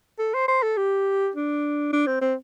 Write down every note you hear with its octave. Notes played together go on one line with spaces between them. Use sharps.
A4
C5
C5
A4
G4
D4
D4
C4
C4